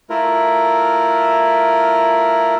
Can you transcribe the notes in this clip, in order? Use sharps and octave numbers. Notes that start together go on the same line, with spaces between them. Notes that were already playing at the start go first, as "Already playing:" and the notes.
A3 E4 F4 A#4